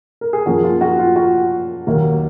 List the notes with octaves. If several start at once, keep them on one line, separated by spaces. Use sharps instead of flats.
A#4
G#4
F#2 F3 A#3 F#4
F4
F#4
F4
F#4
D#2 D#3 F#3 A#3